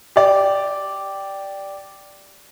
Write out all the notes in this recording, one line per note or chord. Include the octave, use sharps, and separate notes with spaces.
G4 D5